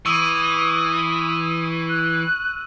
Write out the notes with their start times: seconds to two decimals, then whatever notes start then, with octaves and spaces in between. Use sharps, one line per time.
0.06 E3 C#6 D#6 E6 D#7
1.89 F#6